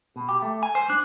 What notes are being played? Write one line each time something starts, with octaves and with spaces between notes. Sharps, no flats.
B2
G4
A3
G#5
C5
D4